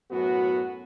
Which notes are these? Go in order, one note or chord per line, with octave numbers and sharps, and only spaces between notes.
F#2 A2 B3 F#4